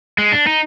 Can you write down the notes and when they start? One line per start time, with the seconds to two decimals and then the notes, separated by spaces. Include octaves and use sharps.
0.18 G#3
0.32 D4
0.47 D#4